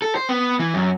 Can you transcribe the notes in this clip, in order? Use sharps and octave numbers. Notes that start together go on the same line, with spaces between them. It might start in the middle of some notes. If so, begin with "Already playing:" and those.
A4
C5
B3
E3
F#2